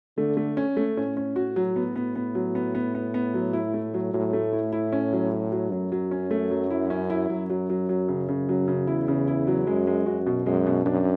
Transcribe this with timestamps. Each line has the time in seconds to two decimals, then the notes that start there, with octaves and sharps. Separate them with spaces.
0.18 D3 A3
0.37 A3
0.57 C#4
0.77 A3
0.97 A2 C#4
1.17 C#4
1.36 F#4
1.56 F#3
1.76 B3
1.96 B3
2.16 B3
2.35 F#3
2.55 B3
2.75 B3
2.95 B3
3.14 B3
3.34 F#3
3.53 E4
3.74 A3
3.94 F#3
4.13 A2 F#3
4.33 A3
4.53 E4
4.73 E4
4.92 C#4
5.13 F#3
5.32 F#3
5.52 F#3
5.72 F#2 F#3
5.92 F#3
6.11 C#4
6.31 A3
6.51 F#3
6.70 E4
6.90 C#4
7.10 E4
7.30 F#2 F#3
7.50 F#3
7.70 F#3
7.89 F#3
8.08 C#3
8.29 C#3
8.49 F#3
8.68 C#3
8.87 E2 E4
9.08 C#3
9.27 E4
9.47 F#3
9.67 F#2 G#3
9.87 G#3
10.06 F#2 F#4
10.26 B2
10.46 F#2 G#3
10.66 B2
10.86 F#2 D4